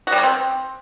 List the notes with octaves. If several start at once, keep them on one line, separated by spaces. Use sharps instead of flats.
F#4
G3
A#3
C4